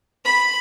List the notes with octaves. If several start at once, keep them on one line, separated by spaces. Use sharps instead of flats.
B5